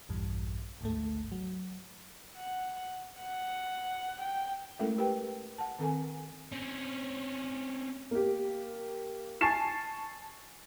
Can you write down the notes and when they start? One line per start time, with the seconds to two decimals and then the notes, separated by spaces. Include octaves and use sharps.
0.09 A#1 E2 G2
0.81 G#1 D2 G#2 A3
1.32 F#3
2.38 F#5
3.19 F#5
4.21 G5
4.79 G#3 A3 C#4 E4 A4 A#4
4.98 G4 A#4 B4 G5
5.58 F#5 A5
5.79 D#3 C4 A4 A#4 F#5 G#5
6.52 C4 C#4
8.11 A#3 G4
9.41 G#5 A5 C#6 A6 C7 E7